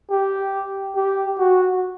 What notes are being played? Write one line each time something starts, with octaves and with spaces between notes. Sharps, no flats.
G4
G4
F#4